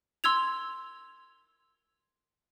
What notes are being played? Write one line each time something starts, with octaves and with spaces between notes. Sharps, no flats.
C6 E6 G#6 F7